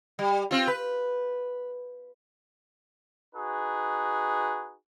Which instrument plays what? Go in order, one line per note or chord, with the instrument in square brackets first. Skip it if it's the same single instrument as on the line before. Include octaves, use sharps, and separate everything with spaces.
[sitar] G3
C4 F4
B4
[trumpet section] D#4 F#4 G#4 B4